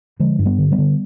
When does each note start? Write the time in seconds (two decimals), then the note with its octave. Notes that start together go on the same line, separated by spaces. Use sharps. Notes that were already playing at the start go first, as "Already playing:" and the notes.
0.20 D3 F3 G#3
0.39 G2
0.45 G3 B3
0.58 D3
0.72 G3 B3
0.78 D3